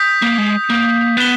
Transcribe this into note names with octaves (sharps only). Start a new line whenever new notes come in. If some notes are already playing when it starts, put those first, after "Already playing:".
Already playing: D#6 G6 B6
A#3
G#3
A#3
B3 F#6 B6 E7 G7